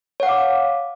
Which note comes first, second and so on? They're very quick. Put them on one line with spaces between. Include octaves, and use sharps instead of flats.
C#5 F#5 F5 D6